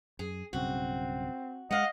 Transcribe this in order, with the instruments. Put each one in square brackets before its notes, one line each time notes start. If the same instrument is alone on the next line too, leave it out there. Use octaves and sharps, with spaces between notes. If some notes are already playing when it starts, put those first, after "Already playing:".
[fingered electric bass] F#2 [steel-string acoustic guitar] G#4
[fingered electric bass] B1 G2 C#3 [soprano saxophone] C4 [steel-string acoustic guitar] F#4
[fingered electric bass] G#3 [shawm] D#5 [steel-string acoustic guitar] F5 F#5